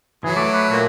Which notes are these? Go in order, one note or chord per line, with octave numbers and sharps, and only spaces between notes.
E3 F#3 G#4
A3 D6
B4
A#2 F#4